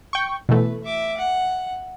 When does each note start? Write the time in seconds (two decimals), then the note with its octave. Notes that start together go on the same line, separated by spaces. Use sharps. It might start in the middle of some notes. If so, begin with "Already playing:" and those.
0.13 G5 C#6
0.49 B2 E3 A3 B4
0.83 E5 D6
1.18 F#5